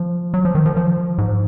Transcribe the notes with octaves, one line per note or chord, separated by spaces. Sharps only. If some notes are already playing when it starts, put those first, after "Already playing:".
Already playing: F3
F#3
F3
D#3
F3
F3
G#2